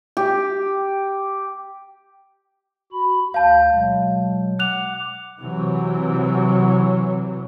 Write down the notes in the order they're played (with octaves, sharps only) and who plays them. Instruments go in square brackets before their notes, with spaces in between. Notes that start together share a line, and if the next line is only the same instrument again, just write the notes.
[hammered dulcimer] G4
[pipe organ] F#4 B5
[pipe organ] D2 G6 [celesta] F5 A5
[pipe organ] B2 F#3 G#3
[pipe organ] F#5 D6 [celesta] F#6 F7
[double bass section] C3 E3 F#3